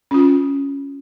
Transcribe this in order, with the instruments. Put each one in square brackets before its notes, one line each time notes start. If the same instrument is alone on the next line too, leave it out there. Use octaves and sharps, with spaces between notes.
[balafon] C#4 F4